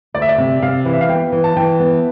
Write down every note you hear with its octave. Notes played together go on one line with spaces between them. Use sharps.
D2 D5
E5
D5
C3
C3 F5
E3
E5
F5
B3 G5
E3
A5
E3 G5
B3